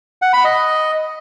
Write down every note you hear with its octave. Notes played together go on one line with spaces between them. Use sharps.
F#5
B5
D#5